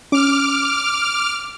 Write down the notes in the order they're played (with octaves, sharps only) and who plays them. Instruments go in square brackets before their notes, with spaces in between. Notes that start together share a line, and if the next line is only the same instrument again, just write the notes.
[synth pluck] C#4 [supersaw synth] D6 F6